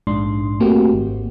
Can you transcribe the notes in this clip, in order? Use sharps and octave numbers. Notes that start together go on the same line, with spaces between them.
A#1 G#2 D4 C6
A3 A#3 C4 F#4 G4
G#1